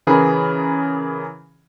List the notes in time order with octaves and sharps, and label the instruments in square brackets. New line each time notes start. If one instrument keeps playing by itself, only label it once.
[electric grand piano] C#3 E3 G#4 A#4 B5